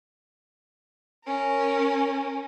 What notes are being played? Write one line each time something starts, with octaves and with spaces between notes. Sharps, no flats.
C#4 A#4